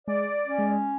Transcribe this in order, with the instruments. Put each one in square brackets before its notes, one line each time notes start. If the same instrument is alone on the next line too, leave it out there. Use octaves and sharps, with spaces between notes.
[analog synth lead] G#3 [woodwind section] D5
[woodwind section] C#4
[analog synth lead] G#3